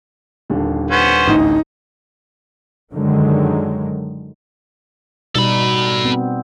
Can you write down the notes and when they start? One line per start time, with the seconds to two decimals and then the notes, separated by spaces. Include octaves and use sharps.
0.50 D#1 D#2 D3
0.91 B3 C#4 C5
1.27 A1 D2 D3 D#4
2.92 F#2 D3 D#3 F#3 G#3
5.35 B2 G3 D#4 A4 B5
6.05 B3 C4